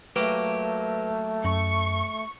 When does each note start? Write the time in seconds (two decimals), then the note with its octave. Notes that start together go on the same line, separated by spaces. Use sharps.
0.16 F#3 A3 A#3 G4 B4
1.45 F#2 C#6